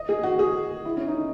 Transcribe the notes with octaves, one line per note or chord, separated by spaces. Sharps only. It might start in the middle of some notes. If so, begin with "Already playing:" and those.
Already playing: D#5
G#4
F#4
G#4
E4
C#4
D#4